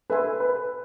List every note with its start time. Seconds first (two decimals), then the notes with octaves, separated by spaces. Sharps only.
0.10 A4 B4 E5 G#5 C6
0.40 B4